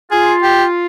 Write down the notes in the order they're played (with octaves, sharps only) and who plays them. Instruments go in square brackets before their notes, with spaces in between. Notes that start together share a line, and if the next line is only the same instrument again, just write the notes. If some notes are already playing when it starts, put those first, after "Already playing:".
[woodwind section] F4 [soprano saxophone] G#4
[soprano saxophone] G4